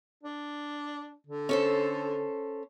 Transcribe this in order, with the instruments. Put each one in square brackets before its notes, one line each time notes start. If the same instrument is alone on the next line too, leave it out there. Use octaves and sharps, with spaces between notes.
[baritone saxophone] D4
D3
[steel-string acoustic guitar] C#4 A4 C5